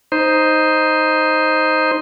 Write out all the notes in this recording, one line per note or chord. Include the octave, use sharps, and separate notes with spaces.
D#4 C5